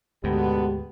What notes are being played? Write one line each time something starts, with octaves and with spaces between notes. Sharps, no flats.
D2 G#2 B2 D3 G#3 B3 G4